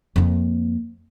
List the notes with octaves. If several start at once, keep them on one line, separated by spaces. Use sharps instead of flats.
F2 A#3